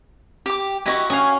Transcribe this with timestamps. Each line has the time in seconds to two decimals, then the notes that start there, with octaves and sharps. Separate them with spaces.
0.46 G4 D6
0.86 E4 F#4 G4 D#5 C#6
1.10 C#4 F5 G#5 D#6